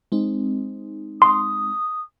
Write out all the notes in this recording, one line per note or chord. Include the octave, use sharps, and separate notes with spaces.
G#3 C4 D#4
C6 D#6